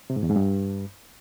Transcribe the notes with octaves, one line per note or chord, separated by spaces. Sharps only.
C3
G#2
E2
G#2
G2